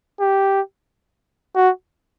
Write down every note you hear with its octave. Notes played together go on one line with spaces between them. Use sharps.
G4
F#4